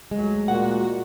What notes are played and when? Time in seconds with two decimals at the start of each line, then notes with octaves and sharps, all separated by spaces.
0.11 D2 F#3 G#3
0.48 A#2 F#4 F#5